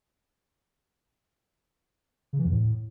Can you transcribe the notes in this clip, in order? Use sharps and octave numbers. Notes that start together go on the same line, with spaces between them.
C#3
E3
E2
A2